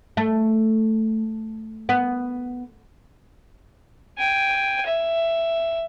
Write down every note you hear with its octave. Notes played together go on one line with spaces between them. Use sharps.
A3
B3
G5 G#5
E5